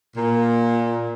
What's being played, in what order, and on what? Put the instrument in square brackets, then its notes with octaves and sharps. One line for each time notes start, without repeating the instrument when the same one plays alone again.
[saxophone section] A#2